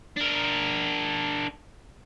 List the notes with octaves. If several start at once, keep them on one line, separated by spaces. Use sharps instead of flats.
D4 A#4